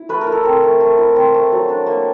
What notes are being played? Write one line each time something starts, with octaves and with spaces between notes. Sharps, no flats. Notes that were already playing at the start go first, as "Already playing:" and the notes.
Already playing: E4
A3 B4
A#4
E4
A4
C4 A#4
A3
A3
E4
C4
A3
F#3
D4
A#3